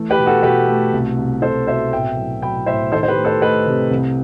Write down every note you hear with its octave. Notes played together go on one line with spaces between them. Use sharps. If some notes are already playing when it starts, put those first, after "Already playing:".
Already playing: E3 A3
G4 B4
B2
F#4 A4
B2 G4 B4
A3
C2
C2
C2 A4 C5
B2 C5 E5
A2 E5 G5
F#3
F#3 G5 B5
A2 C5 E5
D#3 A4 C5
C5
G4 B4
A3
A4 C5
A3 B4 D#5
C3
C2